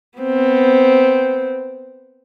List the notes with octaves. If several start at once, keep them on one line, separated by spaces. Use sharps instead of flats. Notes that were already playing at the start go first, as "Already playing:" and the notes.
B3 C4